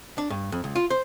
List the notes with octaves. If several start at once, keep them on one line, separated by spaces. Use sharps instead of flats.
D4
G2
F2
C#2
F4
C5